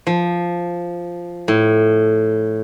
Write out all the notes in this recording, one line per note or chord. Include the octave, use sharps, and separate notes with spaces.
F3
A2